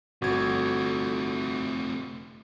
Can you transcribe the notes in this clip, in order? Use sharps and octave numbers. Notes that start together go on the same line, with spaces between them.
G1 C3 A3 F#4 G#6